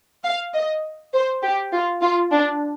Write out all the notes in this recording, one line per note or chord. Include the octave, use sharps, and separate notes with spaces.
F5
D#5
C5
G4
F4
F4
D4